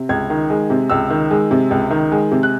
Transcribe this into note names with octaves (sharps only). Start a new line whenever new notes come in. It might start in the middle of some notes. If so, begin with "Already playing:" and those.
Already playing: C3
C#2 G#6
D#3
G#3
C3
C#2 E6
D#3
G#3
C3
C#2
D#3
G#3
C3
F#6